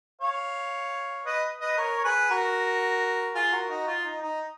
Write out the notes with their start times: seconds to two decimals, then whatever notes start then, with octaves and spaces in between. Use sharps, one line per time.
0.21 C#5 F5
1.26 B4 D#5
1.61 B4 D#5
1.78 A#4 C#5
1.99 C#5
2.04 G#4 B4
2.30 F#4 A#4
3.35 F4 G#4
3.52 F#4 A#4
3.69 D#4 F#4
3.87 F4
4.04 D#4
4.22 D#4